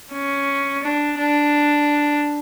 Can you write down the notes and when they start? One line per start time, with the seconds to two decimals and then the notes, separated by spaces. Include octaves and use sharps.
0.13 C#4
0.83 D4
1.19 D4